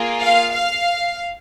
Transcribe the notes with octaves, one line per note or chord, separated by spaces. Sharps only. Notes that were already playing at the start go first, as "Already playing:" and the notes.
Already playing: A#3 F4 G#4
F5
F5